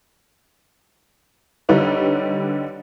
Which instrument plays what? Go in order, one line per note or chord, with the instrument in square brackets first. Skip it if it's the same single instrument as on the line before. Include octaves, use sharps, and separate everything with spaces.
[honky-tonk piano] D3 G3 D4 D#4 B4 C#5